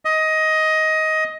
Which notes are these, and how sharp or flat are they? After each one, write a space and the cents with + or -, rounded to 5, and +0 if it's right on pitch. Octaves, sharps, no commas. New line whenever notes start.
D#5 +15